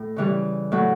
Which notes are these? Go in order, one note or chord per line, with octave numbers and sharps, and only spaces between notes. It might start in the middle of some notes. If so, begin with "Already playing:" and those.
Already playing: A2
C#3 E3 G3
A2 F#3